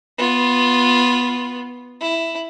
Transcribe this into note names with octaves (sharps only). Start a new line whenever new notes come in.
B3 F4
E4